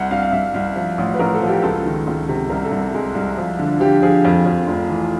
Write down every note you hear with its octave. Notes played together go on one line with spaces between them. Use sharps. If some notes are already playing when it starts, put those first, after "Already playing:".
Already playing: C2 F#5
C2 F5
F5
C2 E5
C2
F3
A1
B4
A1 A#4
A4
F3
G4
C#2 A4
D#3
C#2
C3
C2 A#4
A4
C2
G#3
C2
F3
D3
F3 G4
F3 G#4
F2
F2
F1
E3